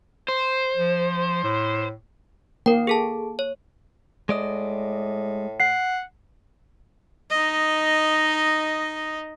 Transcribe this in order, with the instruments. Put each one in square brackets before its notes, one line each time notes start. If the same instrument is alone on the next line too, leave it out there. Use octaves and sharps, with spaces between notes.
[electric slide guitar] C5
[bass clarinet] F3
A2
[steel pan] A#3 [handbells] A#4 G5
[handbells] G#4 A4 A5
C#5
[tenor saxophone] A2 [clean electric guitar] G#3 D5 D#5
[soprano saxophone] F#5 [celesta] C7
[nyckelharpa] D#4 D#5